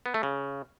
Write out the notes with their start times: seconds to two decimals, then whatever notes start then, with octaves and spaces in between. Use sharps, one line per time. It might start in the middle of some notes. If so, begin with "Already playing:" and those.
0.06 B3
0.14 A3
0.23 C#3